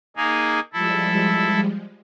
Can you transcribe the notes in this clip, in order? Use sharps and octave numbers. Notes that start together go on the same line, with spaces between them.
A#3 D#4 G#4
F3 G3 G#3 E4 A4